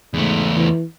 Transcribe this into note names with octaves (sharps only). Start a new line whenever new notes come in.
E2 G#2 A3
E3